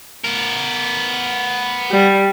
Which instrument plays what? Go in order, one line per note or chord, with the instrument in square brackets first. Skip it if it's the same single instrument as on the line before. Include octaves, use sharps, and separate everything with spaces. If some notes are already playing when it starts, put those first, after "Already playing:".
[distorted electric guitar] B3 A#4
[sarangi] G3